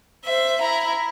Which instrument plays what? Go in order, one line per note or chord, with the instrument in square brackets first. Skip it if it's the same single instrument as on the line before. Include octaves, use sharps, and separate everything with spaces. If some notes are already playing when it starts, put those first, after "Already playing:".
[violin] C5 E5
E4 A#5